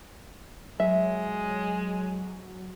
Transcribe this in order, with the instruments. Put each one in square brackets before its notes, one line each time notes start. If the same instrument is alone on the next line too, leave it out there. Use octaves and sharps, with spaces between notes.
[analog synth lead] F#3 [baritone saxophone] G#3 [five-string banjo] E5